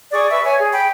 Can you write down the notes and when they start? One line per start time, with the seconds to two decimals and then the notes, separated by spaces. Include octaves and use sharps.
0.12 G#4 D5 C#6 D#6
0.30 B4 E5 C#6
0.46 C#5 G#5
0.59 G#4
0.73 G5 B5